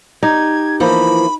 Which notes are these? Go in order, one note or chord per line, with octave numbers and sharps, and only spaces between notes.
D#4 G4 G#6
E3 F3 A#3 B5